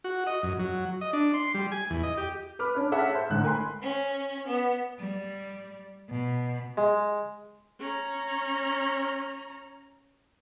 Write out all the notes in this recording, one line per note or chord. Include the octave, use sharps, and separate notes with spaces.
F#4
D#5
F#2
F#3
D#5
D4
C6
G3
G#5
E2
D#5
G4
B4 B5 D6 F6
C#4 D4 C#5
G#4 A4 C#5 E5 F#5
A4 C5
A1 G#2 D3 F#6
A#4 G#5 B5 C6
C#4
B3
G3
B2
G#3
C#4 A#5